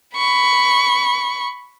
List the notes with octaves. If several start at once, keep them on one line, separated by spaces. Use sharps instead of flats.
B5 C#6